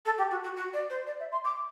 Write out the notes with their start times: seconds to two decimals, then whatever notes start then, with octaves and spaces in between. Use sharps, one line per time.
0.06 A4
0.18 G4
0.31 F#4
0.43 F#4
0.56 F#4
0.74 D5
0.90 C5
1.07 D5
1.20 E5
1.32 C6
1.45 D6